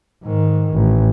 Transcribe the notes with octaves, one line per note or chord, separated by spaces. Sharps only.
G#2 D#3
A1